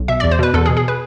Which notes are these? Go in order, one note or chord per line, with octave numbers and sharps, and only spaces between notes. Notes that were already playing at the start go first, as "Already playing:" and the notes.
Already playing: B1
B2 E5
D5
E2
C5
B2 B4
E2 A4
G#4
B2
G#4
B4